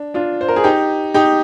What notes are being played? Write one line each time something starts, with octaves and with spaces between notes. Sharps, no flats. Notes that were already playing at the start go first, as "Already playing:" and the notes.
Already playing: D4
D4 F4
C5
A#4
G#4
D#4 G4
D#4 G4